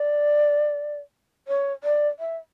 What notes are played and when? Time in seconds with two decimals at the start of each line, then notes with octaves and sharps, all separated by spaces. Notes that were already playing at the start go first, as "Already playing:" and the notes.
Already playing: D5
1.48 C#5
1.84 D5
2.19 E5